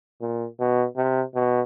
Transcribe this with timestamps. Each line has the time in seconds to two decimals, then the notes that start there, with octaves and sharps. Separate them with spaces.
0.21 A#2
0.59 B2
0.96 C3
1.35 B2